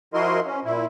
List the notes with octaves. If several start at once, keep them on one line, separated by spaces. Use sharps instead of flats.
F3 E4 F#4 A#4 D#5 C6
C#4
A#2 E4